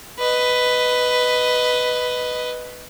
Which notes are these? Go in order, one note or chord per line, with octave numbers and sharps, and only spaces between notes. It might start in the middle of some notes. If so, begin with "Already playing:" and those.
B4 D#5